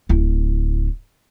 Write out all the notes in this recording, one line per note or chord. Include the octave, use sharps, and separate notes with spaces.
D1 E4